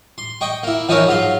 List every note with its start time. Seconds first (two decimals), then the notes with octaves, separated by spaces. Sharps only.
0.18 C6
0.41 D#5 G5 C#6
0.63 A#3 E4
0.88 E3 F3 D#4 E4 A#4 C#5
1.07 G#2 F#3 F4 C6